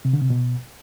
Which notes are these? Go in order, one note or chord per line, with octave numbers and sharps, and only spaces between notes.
C3
D3
C3
B2